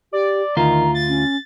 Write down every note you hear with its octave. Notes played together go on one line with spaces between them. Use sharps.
G4 D5
D2 D#3 F4 A#5
A6
C#4